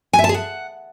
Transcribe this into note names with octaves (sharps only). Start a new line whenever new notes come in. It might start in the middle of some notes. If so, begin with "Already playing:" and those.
G#5
E5
A5
G#4
F#5